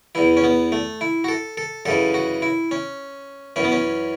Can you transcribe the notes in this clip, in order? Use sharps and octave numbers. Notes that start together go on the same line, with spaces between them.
E2 E3 E4
C#4
B3
A3
E4
F#4
A4
A4
F#2 C#3 E3 A4
F#4
E4
C#4
F#2 E3 C#4
B3
C#4